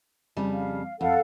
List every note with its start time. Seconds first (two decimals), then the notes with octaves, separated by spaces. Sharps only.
0.37 F2 C#3 G3
0.52 F5
1.01 F2 A4 F5 F#5